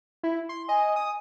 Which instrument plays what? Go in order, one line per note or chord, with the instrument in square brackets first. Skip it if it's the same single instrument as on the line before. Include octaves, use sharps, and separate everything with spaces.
[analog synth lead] E4
C6
[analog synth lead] D#5 [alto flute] G#5
[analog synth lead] D#6